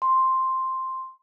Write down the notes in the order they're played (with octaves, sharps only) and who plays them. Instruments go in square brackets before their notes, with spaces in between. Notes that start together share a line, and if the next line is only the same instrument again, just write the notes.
[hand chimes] C6